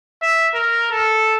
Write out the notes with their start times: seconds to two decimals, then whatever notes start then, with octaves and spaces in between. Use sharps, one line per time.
0.22 E5
0.55 A#4
0.91 A4